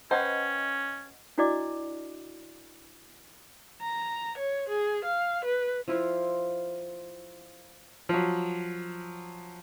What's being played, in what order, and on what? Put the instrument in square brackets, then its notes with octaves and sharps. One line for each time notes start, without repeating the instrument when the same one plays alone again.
[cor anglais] C#4 [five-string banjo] B4 C5 [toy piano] D#5 F#5 G5
[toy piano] D4 E4 F#4 D5 D#5 D6
[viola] A#5
C#5
G#4
F5
B4
[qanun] F3 E4 F4
[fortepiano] F3 F#3